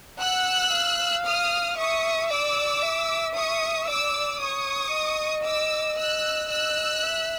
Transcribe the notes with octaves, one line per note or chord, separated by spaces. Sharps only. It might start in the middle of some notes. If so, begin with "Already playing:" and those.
F#5 E6 F#6
F5
D#6 F6
E5 C#6 D#6
D5 D6 E6
E5
C#6 D#6
D5 D6 E6
C#5 C#6 D#6
D#5
D6 E6
E6 F#6
D#5 E6 F#6
E5